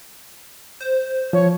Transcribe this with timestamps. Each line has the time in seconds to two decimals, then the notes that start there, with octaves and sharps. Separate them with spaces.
0.80 C5
1.33 F3 C#5